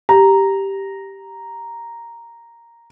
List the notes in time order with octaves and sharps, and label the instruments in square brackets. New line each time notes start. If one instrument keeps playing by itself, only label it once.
[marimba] G4 [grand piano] A#5